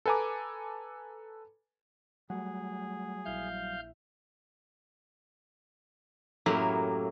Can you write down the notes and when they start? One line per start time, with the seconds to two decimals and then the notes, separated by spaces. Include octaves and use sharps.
0.06 A4 B4 G#5 A#5 D6
2.30 F#3 G3 A3 G#4 F#5
3.25 A#1 E4 E5 F5 F6 G6
6.46 F#2 A2 F#3 A#3 E4 G4